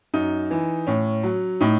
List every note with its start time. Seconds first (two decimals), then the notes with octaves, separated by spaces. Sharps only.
0.14 F#2 D#4
0.51 E3
0.87 A2 C#4
1.23 F#3
1.61 A2 D#4